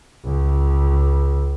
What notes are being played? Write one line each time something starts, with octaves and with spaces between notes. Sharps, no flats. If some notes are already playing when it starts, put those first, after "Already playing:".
C#2